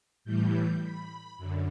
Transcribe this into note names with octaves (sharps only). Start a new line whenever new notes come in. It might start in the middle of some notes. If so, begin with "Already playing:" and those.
A2 E3 G3 G6
B5
F#2 D3